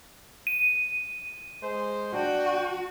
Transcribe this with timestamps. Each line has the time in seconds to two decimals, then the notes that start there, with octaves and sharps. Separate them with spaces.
0.47 D#7
1.63 G#3 C5
2.14 D4 F#4 G5